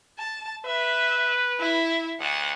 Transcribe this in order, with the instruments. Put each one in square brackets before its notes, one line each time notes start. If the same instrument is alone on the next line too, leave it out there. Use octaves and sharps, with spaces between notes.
[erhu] A5
[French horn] B4 [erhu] E5
[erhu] E4
[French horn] D2 [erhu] F#5